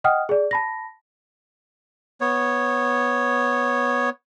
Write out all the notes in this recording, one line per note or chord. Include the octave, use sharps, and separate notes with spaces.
D#5 F#5 G5 D#6 F6
G#4 D5
A5 B5 A#6
B3 C#5